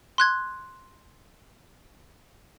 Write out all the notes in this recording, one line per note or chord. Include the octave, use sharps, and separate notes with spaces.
C6 F#6 G#6